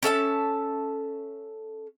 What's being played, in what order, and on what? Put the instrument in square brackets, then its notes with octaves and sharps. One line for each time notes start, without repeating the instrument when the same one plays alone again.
[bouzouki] C#4 A4 E5 A5